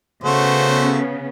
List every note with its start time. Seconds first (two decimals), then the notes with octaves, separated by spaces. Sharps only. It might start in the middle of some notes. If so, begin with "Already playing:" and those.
0.24 C#3 A3 B3 F#4 C5